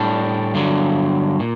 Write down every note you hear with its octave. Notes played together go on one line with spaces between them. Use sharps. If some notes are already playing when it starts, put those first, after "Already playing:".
Already playing: A2 G3 D4
G2 D3 F#3
A#2